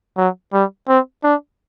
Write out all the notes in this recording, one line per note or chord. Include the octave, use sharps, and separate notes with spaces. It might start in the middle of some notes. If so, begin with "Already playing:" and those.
F#3
G3
C4
D4